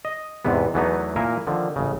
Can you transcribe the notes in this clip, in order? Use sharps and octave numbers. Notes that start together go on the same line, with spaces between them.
D#5
E2 G#2 C3 B3
E2 E3 F#3 A3 B3 D#4
A#2 A#3 E4 A#4 G#5
D3 D#3 F3
A1 C#3